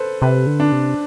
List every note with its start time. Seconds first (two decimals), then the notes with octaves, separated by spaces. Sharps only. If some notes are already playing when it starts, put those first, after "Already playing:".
Already playing: A4 B4 C5
0.22 C3 B4
0.47 D3
0.60 D4
0.72 C3